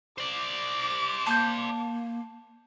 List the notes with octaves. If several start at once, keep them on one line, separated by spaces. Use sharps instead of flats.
C5 D5 D6
A#3 A5 G6